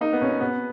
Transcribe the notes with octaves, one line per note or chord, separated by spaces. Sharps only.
A#3 D#4
B3
B2 C#4
B2 B3